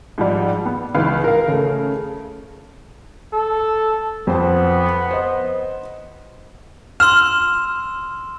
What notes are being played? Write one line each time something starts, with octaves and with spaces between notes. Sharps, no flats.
G#2 F3 G3
B3
C#2 E3 D#4 B4 F5
A#4 F5
C#3 A3
A4
F2 B3 C5 A5
C5 D#5
C6 E6 F6 E7